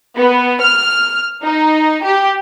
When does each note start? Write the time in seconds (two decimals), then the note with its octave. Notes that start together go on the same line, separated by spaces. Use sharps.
0.17 B3
0.61 F6
1.43 D#4
2.04 G4